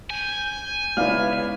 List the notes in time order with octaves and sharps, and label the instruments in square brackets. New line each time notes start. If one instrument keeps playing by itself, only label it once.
[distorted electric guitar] G#5 [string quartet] G6
[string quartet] C#3 B3 [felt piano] G#3 D#4 E4 [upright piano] D5 F5 F6